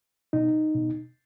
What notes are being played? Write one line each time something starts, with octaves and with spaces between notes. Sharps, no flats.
B2 D#4
B2